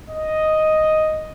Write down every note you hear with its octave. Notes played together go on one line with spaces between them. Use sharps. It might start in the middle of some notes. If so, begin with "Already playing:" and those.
D#5